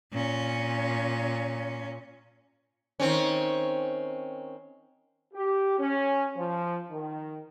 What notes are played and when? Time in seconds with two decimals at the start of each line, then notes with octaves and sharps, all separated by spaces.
0.13 A#2 C#4
3.00 D#3 C4 C#4
5.34 G4
5.79 C#4
6.36 F3
6.91 D#3